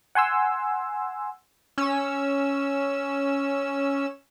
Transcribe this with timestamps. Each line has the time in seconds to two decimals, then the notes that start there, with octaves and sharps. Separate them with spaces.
0.15 F#5 G#5 C6 E6
1.78 C#4 E6